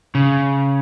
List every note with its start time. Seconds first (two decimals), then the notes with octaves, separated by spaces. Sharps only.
0.15 C#3